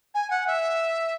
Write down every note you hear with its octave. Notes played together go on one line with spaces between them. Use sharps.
G#5
F#5
E5